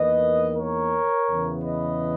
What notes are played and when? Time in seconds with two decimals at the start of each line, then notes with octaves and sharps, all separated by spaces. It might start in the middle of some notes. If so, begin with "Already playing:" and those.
Already playing: E2 D#3 A#3 B4 D#5
0.56 A#4 C#5
1.27 E2 C#3 E3 B3
1.63 B4 D#5